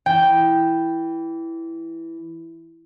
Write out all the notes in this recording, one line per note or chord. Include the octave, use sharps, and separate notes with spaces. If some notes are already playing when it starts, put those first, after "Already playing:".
E3 G5